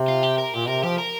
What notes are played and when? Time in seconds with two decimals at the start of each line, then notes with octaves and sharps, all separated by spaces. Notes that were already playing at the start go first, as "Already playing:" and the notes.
Already playing: C3
0.08 F4
0.23 G4
0.38 A#4
0.54 A#2 G4
0.68 C3 A#4
0.84 F3 G4
0.98 A#4